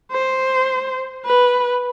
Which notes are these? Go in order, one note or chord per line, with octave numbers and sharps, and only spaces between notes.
C5
B4